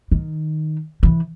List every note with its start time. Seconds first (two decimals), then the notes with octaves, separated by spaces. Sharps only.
0.12 D#3
1.03 E3